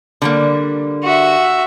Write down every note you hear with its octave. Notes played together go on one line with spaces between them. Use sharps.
D3 G3 A#3
F#4 E5